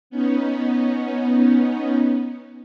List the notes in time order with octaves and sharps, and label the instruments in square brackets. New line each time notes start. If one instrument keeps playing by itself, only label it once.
[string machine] B3 C#4 D#4